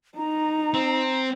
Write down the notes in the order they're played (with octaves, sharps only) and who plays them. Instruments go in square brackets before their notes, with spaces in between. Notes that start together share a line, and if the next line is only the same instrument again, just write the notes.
[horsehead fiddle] D#4 [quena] A#5
[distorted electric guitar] C4